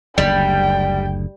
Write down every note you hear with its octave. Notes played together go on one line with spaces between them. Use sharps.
F#1 D2 G3 G5